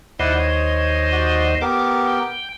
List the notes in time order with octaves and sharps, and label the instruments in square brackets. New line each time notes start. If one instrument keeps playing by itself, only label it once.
[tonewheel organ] D#2 C5 D#5 [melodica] E4 D5 F#5
[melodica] C#5
F#4 D5
[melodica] B3 G4 A#4 [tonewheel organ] D6
[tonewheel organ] G5